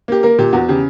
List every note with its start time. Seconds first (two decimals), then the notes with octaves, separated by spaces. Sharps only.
0.08 A#3 G4
0.23 A#3 A#4
0.38 A#2 G4
0.53 E2 F#4
0.69 C#3 G4